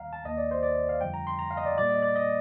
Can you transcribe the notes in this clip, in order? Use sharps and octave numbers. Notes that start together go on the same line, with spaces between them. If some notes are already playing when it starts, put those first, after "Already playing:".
Already playing: D#2 D#3 G3 F5 A#5
A5
D#2 D#3 A#3 D#5
D5
C5
D5
F5
F2 D3 G3 G5
A#5
C6
A#5
F5
D#5
D5
A#2 G3 A#3 D5
D#5
D5
D#5